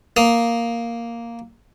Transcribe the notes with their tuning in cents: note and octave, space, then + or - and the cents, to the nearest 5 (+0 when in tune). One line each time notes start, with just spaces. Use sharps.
A#3 +0 D#6 +0